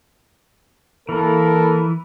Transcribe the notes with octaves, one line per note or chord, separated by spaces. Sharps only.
E3 A#3 A4 A#4